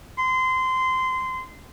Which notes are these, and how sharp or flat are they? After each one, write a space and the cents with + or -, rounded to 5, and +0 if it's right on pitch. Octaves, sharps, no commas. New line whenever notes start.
C6 -20